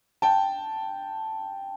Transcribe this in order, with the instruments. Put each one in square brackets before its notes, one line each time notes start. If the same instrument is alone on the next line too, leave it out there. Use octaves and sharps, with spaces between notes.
[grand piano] G5 A5